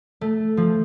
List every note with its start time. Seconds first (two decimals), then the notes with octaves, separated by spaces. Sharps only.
0.21 A3
0.57 F3